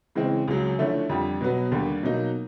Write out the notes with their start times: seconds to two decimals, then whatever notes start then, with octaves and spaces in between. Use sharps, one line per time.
0.15 C#3 E3 G#3 C4
0.48 C#2 C#3 F#3
0.79 D3 F3 A3 C#4 E4
1.09 F2 D3 G3
1.41 B2 F#3 B3
1.71 D#2 D3 G3
2.03 B2 F#3 A#3 D#4